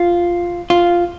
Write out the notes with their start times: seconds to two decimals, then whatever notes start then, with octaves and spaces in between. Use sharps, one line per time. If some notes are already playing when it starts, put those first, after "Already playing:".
Already playing: F4
0.70 F4